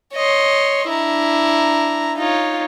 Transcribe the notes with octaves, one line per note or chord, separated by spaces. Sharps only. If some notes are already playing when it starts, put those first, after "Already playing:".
C#5 D#5 C6
D4 E4 A#5
D#4 F4 C#5